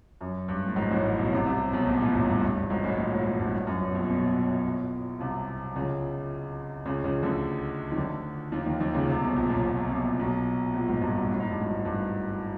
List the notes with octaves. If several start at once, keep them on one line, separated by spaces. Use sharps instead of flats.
F#2
G2
A2
G#1 G#2
A1 A2
B1 B2
C2 C3
C2 C3
B1 B2
A#1 A#2
A1 A2
G2
G2
G2
G2
G#1 G#2
A1 A2
A#1 A#2
G#1 G#2
G#1 G#2
G2
G2
F#2
G2
B2
A#1 A#2
B1 B2
C2 C3
C#2 C#3
C#2 C#3
C#2 C#3
D2 D3
D#3
D2 D3
D#2 D#3
D#2 D#3
D#2 D#3
C#2 C#3
C2 C3
B1 B2
A#1 A#2
B1 B2
A#1 A#2
B1 B2
B1 B2
A#1 A#2
G#1 G#2
G2
G2
A2
G#2
G2
G#1 G#2
G2